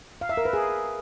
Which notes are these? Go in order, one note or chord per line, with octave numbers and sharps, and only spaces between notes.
F5
E5
A#4
B4
G#4